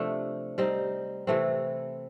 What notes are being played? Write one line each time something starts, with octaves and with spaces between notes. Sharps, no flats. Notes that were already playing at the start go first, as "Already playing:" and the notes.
Already playing: C3 F3 A3 D4
G3 C4 D#4
C3 E3 A3 C4